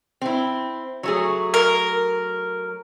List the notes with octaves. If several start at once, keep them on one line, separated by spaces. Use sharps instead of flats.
C4 E4
F#3 A3 G#4
A#4